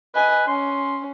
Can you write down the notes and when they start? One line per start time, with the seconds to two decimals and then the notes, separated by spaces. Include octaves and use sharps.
0.15 B4 D#5 G#5
0.47 C#4 C6